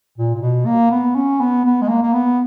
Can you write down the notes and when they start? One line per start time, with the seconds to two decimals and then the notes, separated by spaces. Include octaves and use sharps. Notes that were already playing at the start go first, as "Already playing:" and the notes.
0.18 A#2
0.35 A#2
0.41 B2
0.66 A#3
0.91 B3
1.15 C#4
1.40 B3
1.65 B3
1.82 G#3
1.89 A#3
2.02 A#3
2.13 B3